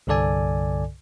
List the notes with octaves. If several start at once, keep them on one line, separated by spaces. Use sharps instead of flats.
C2 G2 D3 A4 D5 G#5